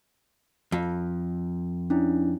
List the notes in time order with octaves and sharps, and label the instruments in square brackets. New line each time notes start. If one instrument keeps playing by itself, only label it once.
[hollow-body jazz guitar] F2
[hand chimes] C#4 D4 E4